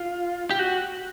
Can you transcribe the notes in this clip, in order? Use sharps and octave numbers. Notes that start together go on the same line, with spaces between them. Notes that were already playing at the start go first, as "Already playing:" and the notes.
Already playing: F4
G4
F#4